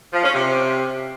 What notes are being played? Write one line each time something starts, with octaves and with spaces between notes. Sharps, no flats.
F3
C#4
C3